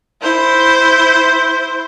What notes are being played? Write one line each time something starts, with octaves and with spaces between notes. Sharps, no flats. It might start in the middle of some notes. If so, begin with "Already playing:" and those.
E4 C5